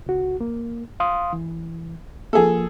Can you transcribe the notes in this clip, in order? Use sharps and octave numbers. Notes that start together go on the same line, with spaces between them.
C#2 F#4
A#3
F5 C6 D#6
E3
F3 A#3 G#4 A4